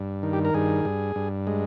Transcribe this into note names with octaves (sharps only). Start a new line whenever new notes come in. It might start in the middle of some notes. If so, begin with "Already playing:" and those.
Already playing: G2
D#3
G4
A#4
G2 G#4
G2
G2
G#3